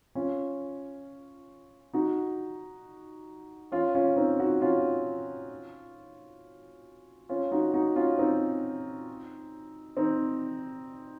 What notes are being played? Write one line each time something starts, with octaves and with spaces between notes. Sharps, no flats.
C#4 F4
D#4 F#4
C#4 F4
C#4 F4
C4 D#4
D#4 F#4
C#4 F4
C#4 F4
D#4 F#4
D#4 F#4
C#4 F4
C4 D#4
C4 D#4